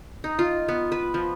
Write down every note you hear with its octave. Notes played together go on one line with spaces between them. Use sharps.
D#4
F4
B3
B4
F3